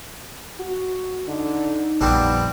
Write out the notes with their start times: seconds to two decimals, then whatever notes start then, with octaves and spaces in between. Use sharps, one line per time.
0.59 F#4
1.28 D3 D#4
2.01 A#1 F2 G3 B3 C4 D4